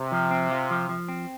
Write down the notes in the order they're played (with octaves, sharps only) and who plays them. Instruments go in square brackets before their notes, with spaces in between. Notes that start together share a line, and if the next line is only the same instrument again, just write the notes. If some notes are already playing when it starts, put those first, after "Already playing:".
Already playing: [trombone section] C3
[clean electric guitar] F3
C4
F4
F3
F3
C4